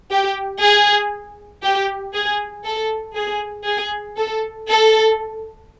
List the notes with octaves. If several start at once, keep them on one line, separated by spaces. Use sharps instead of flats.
G4
G#4
G4
G#4
A4
G#4
G#4
A4
A4